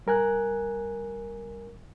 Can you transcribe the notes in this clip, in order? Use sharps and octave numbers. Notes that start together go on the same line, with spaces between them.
G3 A#4 G#5 F#6